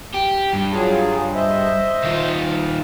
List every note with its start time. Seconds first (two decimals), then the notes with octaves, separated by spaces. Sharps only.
0.14 G4
0.53 G2
0.72 F#3 F4 G#4
1.35 C5 D#5 E5
2.04 D#3 F4